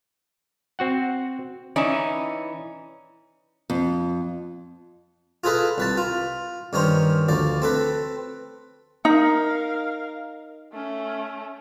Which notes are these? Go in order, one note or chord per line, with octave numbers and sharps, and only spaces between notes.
C4 F#4 F#5
E3 C#4 D#4 D5 E5
F2
F4 G#4 A4 B4 D#5
C2 B4 A5
F4
G2 D#3 C#4 A#4 C5
D2 F3 D5
C4 A4 B4
D#4 A#4 F5
A3 C#4